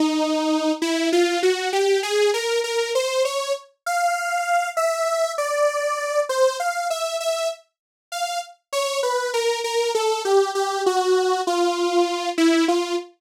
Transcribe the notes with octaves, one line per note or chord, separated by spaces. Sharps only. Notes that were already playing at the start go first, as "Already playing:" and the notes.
Already playing: D#4
E4
F4
F#4
G4
G#4
A#4
A#4
C5
C#5
F5
E5
D5
C5
F5
E5
E5
F5
C#5
B4
A#4
A#4
A4
G4
G4
F#4
F4
E4
F4